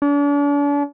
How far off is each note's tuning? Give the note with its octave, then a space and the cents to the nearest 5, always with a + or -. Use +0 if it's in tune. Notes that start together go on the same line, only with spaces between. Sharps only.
D4 -40